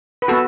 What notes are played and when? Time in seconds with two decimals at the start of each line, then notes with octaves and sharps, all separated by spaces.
0.22 B4
0.28 B3 F#4 A4